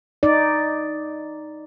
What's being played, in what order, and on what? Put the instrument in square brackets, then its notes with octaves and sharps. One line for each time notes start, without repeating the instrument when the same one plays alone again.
[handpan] D#4 D5